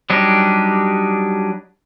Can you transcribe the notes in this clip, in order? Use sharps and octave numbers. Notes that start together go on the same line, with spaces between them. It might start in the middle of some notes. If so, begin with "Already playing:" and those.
F#3 G3 D4 D#4 G4